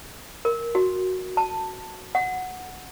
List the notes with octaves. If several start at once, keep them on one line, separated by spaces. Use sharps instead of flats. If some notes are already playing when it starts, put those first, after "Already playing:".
A#4
F#4
A5
F#5